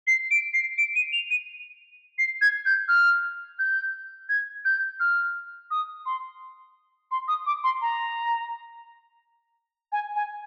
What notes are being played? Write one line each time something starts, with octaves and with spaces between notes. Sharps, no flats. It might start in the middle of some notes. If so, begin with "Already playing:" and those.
C7
D7
C7
D7
D#7
F7
D#7
C7
G#6
G6
F6
G6
G#6
G6
F6
D#6
C6
C6
D#6
D6
C6
A#5
G#5
G#5